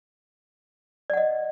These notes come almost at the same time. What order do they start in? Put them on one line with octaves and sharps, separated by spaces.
D5 F#5 D#5